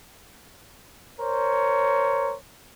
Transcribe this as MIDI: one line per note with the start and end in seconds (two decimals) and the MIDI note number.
1.20 2.35 70
1.20 2.35 72
1.20 2.35 73